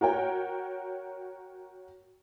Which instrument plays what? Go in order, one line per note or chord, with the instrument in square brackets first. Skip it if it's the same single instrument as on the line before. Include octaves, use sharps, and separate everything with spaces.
[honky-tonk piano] F#4 A#4 C#5 G5